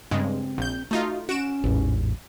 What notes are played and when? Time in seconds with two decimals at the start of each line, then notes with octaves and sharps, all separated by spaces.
0.11 G2 C#3 G#3 C4
0.58 A#1 G6
0.91 A3 D#4 F4 F#4
1.29 C#4 F#4 D7 E7
1.64 A1 E2 G#2